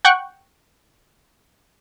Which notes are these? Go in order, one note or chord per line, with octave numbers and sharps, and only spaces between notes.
F#5 G5 C#6 F#6